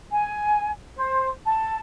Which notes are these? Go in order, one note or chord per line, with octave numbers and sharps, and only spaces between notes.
G#5
C5
A5